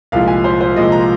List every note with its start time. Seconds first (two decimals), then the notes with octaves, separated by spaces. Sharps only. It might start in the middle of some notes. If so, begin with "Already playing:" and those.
0.12 C2 A#2 F3 G#3 F5
0.28 G#5
0.44 C5
0.61 C5
0.76 C2 A#2 F3 G#3 D#5
0.92 A#5